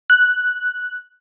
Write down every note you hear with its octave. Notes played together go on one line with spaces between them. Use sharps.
F#6